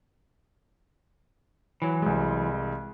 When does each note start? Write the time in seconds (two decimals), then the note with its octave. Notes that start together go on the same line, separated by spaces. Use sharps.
1.82 E3 F#3
2.02 C2 G#3